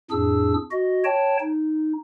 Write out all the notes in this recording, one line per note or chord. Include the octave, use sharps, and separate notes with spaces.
F2 A2 D4 G#4 E6
F#4 D#5
C#5 G5 A5
D#4